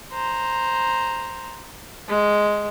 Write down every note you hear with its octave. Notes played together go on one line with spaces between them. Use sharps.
C5 A#5
G#3